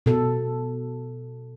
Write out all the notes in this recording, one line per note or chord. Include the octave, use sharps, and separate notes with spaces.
B2 A4